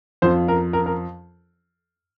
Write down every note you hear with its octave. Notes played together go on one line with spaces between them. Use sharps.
F2 F3 C5
A#4
A#4
A#4